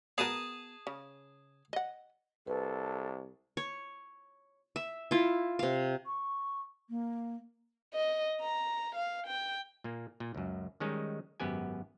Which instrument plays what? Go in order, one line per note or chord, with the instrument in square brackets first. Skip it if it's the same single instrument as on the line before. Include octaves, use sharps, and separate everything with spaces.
[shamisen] B3 F#4 A#4 [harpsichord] G#4 A5 D#6
[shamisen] C#3
D#5 F#5
[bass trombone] C2 [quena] A4 [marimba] B4
[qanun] C#5
E5
E4 F4
C3 F5
[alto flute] C#6
A#3
[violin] D#5
A#5
F5
G5
[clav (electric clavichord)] A#2 A#3
A#2
C#2 F#2
D#3 G3 G#3 C#4 D#4
G#1 F#2 B3 G4 G#5